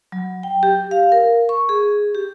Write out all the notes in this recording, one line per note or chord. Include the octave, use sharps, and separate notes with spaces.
F#3
G5
G4
F5
A#4
C#6
G#4
G4